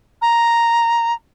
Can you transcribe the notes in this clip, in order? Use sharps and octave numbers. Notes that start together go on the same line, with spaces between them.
A#5